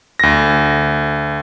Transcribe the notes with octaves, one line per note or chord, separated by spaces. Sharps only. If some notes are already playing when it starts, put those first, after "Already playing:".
D2 A#6